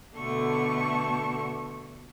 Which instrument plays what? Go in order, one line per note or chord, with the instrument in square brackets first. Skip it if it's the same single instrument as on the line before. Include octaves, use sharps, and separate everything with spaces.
[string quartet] B2 D3 A3 C#6